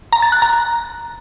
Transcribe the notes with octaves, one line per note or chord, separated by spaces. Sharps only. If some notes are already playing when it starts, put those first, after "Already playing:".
A#5
A6
F#6
A#5